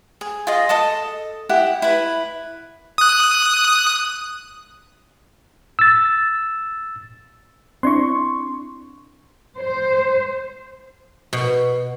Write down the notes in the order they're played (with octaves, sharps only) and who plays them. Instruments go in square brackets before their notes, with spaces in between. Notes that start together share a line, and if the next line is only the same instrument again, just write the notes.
[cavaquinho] G#4
F4 G#4 D#5
A4 D#5 A5 D#6
E4 G4 F#5
E4 B4
[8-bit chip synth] D#6 F#6
[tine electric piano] E6 A6
[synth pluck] C4 D4 E4 [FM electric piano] C6 C#6
[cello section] C5
[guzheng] B2